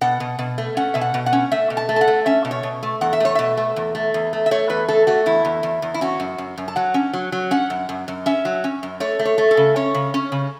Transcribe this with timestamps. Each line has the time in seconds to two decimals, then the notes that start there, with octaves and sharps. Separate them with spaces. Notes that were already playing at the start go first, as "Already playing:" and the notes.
0.01 B2 F#5
0.20 B2
0.39 B2
0.58 A3
0.77 C#4 F#5
0.94 B2 E5
1.01 F#5
1.14 B2
1.26 F#5
1.33 C#4
1.52 A3 E5
1.70 B2
1.77 A5
1.89 A3
1.96 A5
2.01 F#5
2.08 A3
2.26 C#4 E5
2.45 B2
2.51 C#5
2.63 B2
2.83 A3
3.01 E2 F#5
3.13 E5
3.20 A3 C#5
3.35 B2 E5
3.57 A3
3.76 E2
3.95 A3
4.14 E2
4.33 A3
4.46 E5
4.51 A3 C#5
4.70 E2 B4
4.89 A3 A4
5.07 A3 F#4
5.26 E2 E4
5.45 E2
5.63 E2
5.82 E2
5.94 E4
6.01 C#4 F#4
6.20 F#2
6.38 F#2
6.58 F#2
6.68 A5
6.76 F#3 F#5
6.94 C#4
7.14 F#3
7.32 F#3
7.51 C#4 F#5
7.70 F#2
7.89 F#2
8.08 F#2
8.26 C#4 E5
8.45 F#3
8.64 C#4
8.83 F#2
9.00 A3 C#5
9.19 A3
9.25 C#5
9.38 A3
9.51 A4
9.57 C#3
9.76 C#4 C#5
9.94 C#3
10.14 C#4
10.32 C#3